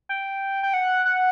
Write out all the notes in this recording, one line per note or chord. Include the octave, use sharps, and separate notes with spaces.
G5
G5
F#5
F#5